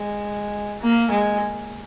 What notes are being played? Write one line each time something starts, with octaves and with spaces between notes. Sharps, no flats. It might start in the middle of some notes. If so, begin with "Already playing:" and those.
Already playing: G#3
A#3
G#3